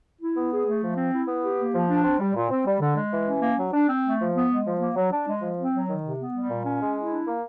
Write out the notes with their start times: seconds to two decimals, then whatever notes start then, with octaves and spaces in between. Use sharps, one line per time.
0.20 E4
0.35 B3
0.51 G#4
0.66 A3
0.82 F3
0.97 C4
1.13 E4
1.27 B3
1.43 G4
1.58 A#3
1.74 F3
1.89 D4
2.04 C4
2.19 G3
2.34 A#2
2.50 C4
2.66 G3
2.80 D3
2.96 G#3
3.12 E3
3.26 C#4
3.42 A#3
3.57 F#3
3.73 D4
3.88 C4
4.04 A3
4.19 F3
4.34 B3
4.50 G#3
4.65 F3
4.80 A#3
4.96 F#3
5.12 D4
5.27 G#3
5.42 F3
5.57 C4
5.73 F#3
5.89 D#3
6.03 C3
6.18 B3
6.34 G3
6.49 A#2
6.65 C#4
6.80 G#3
6.96 E4
7.11 D4
7.26 A#3